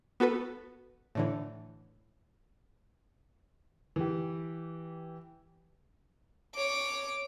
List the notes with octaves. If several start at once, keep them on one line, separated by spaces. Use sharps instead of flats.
B3 F#4 A4 B4
A2 D3 E3
E3 G4
C#5 D6